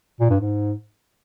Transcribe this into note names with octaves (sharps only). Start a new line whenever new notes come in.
A#2
G2
G#2